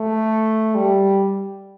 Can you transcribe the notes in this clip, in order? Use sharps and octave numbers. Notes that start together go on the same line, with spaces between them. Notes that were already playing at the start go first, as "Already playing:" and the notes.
Already playing: A3
G3